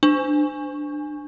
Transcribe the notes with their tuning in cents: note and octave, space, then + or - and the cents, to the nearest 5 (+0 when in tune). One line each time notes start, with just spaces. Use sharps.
D4 +20